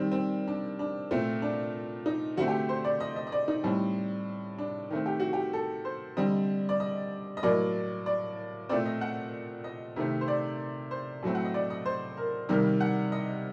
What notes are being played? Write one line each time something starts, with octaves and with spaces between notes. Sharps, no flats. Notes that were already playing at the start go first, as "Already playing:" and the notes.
Already playing: D#3 G3 C4
C4
D4
D4
A#2 A3 C4
D4
D#4
D3 A3 C4 F#4
G4
C5
D5
D#5
D#5
D#5
D5
D#4
A2 G3 C4
D4
D#3 A3 C4
G4
F#4
G4
A4
C5
D3 G3 C4 D#5
D5
D#5
D#5
A2 F#3 A#3 D5
D5
A#2 A3 C4 D5
D#5
F#5
D#5
C3 D#3 A3 C4
C5
D5
C5
A2 F#3 A3 C4
F#5
D#5
D5
D#5
C5
A#4
C3 D#3 G3 A#3
F#5
D#5